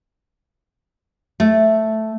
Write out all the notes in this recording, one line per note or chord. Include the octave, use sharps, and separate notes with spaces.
A3